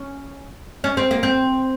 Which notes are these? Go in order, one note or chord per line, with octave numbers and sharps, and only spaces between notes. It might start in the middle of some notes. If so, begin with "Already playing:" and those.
Already playing: C#4
C#4
C4
A#3
C4